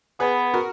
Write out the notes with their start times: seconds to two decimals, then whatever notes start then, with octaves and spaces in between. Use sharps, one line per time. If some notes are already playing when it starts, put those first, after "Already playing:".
0.20 B3 G#4 B4
0.54 F#4 A#4